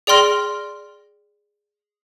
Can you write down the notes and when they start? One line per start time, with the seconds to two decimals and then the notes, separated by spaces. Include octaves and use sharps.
0.07 G#4 D5 G5 C6 F6 A#6